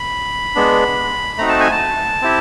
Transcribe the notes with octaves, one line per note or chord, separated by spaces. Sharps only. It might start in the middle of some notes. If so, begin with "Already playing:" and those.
Already playing: B5
G#3 B3 D4
A3 C4 D#4 F#4 A#5
A5
G#5
A5
C4 E4 G4